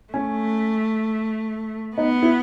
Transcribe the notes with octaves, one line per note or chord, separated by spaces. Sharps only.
A3 C#4
B3 D#4
E4